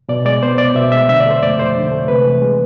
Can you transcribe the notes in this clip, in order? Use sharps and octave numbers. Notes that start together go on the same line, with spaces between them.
B2 D5
G#3 D5
B3 C5
C2 D5
B2 E5
G#3 E5
D3 E5
D5
A3 C5
F2 D5
F2 C5
D3
A3
C3 B4
E3
G#3